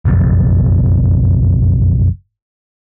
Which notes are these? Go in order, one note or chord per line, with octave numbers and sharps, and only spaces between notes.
F#1 B1 F2